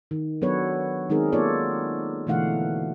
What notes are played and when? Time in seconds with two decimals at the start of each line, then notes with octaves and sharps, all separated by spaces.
0.11 D#3
0.42 F#3 B3 D4 A4 B4 C#5
1.10 D#3 G#3 C4 D#4 G#4 A#4
1.32 A#3 B3 F4 A4 C#5 D5
2.27 B2 D3 E3 A3 F5 F#5